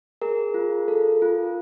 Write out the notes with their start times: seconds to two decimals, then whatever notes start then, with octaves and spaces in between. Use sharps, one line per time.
0.22 G#4 A#4
0.54 F4
0.88 A4
1.22 F4